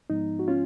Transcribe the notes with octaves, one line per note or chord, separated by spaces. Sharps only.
G#2 F3 G#3 B3 D#4
F#4
C#4 F4